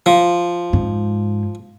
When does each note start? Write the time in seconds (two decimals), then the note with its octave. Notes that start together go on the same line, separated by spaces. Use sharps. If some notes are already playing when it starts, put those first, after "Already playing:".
0.06 F3
0.73 G#2